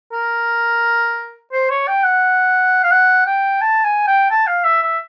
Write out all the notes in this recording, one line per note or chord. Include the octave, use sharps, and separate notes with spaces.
A#4
C5
C#5
G5
F#5
F5
F#5
G5
A5
G#5
G5
A5
F5
E5
E5